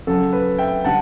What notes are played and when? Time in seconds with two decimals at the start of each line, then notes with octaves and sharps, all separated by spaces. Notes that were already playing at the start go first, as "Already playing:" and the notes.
0.07 F#2 C#3 F#3 A4
0.33 B4
0.58 E5 G5
0.84 D3 G3 F#5 A5